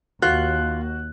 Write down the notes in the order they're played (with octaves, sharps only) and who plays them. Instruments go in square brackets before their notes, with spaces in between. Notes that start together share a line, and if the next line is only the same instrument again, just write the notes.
[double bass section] D#2 [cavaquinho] F4 [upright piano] F#4 [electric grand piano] F#6